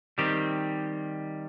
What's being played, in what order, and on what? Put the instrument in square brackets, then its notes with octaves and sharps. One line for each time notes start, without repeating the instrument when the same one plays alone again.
[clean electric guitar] D#3 G3 C4 G4